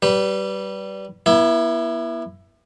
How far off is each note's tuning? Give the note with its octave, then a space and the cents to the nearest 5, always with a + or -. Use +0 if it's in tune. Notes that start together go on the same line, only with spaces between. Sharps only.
G3 -15 B4 +0
B3 -40 E4 +10